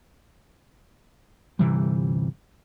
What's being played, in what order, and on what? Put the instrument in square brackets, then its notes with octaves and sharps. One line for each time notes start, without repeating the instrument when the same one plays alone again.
[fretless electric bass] G1 C3 E3 G3